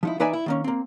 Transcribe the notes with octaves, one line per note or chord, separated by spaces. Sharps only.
F3 D#4 E4
E3 D#4 B4 D5 E5 G#5
E4
D#3 A#3 C#4
A#3 C4